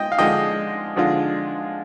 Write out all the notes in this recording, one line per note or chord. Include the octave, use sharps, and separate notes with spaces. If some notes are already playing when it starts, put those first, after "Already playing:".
Already playing: G#3 F4 D#5 G5
F5
D3 F3 G#3 D4 F4 D#5 G5
D3 F3 G#3 D4 F4